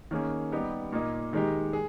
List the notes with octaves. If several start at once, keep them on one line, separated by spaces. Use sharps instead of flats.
D#3 A#3 C#4 G#4
G3 B3 D#4 G4
A#2 A#3 D#4
D#3 G#3 D#4 G4
G#4